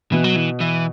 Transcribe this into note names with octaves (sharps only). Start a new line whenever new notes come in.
B2 E3
F#3
E3
E3